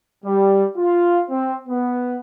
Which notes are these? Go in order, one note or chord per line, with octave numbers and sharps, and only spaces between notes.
G3
F4
C4
B3